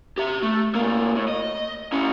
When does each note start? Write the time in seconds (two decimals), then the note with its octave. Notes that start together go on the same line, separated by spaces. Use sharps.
0.18 G4 E5
0.42 A3
0.75 C3 A#3
1.15 A2
1.28 D#5
1.92 C#4 E4